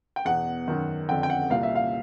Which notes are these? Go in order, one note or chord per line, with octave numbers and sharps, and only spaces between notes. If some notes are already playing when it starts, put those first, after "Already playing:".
G5
E2 B2 F#5
F#2 D#3
F2 D3 G5
G5
F#5
C2 A#2 F5
E5
F5